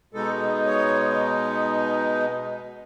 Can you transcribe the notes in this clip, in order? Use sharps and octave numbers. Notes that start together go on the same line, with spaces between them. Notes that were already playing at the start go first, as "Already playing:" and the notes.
B2 G#3 B3 D#4 A4
C#5